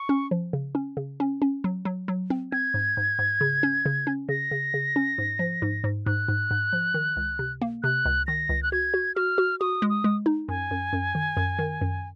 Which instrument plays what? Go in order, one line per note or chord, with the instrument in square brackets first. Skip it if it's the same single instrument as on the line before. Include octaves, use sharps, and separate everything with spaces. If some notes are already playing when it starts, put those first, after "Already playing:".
Already playing: [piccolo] C#6
[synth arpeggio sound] C#4
F3
C#3
C#4
C#3
C#4
C#4
F#3
F#3
F#3
C4
[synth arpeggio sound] C4 [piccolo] G#6
[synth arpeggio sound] G#2
G#2
G#2
C#3
C#4
C#3
C#4
[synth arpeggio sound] C#3 [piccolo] A#6
[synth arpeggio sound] C#3
C#3
C#4
G#2
F3
G#2
G#2
[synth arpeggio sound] G#2 [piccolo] F#6
[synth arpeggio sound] G#2
G#2
F3
D#3
C#2
C3
A#3
[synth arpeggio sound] C3 [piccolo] F#6
[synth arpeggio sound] C#2
[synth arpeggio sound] D#3 [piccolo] A#6
[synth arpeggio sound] C#2
[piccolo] F#6
[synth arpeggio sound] F#4 [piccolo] G#6
[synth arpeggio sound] F#4
[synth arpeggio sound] F#4 [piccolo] F6
[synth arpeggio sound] F#4
[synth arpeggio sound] F#4 [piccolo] D#6
[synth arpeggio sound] G#3
[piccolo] D#6
[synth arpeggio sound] G#3
D#4
[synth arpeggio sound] F#2 [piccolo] G#5
[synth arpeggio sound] F#2
F#2
D#3
F#2
D#3
F#2